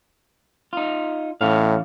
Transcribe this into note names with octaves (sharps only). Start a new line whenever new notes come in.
D#4 F4
A2 E3 C#4 F5